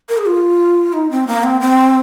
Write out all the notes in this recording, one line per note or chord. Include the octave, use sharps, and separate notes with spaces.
A#4
G#4
F4
D#4
C4
A#3
C4
C4